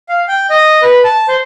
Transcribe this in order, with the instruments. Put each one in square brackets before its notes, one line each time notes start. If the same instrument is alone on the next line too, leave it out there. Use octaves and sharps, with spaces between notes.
[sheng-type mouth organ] F5
G5
D#5
B4
A5
C5